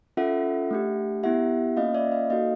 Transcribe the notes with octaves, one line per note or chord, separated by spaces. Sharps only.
C#4 F4 A4 E5 F#5
A3 D4 G4
B3 E4 G4 E5 F#5
A#3 C#4 F4 D#5 F5
D5 E5
D#5 F5
A#3 D#4 F#4 A4 D#5 F5